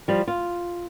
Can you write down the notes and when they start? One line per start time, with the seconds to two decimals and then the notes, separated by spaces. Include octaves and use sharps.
0.08 F3 G3
0.28 F4